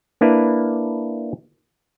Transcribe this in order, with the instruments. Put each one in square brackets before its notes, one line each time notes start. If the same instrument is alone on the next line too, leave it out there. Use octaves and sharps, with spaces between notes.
[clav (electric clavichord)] A#3 D4 E4 B4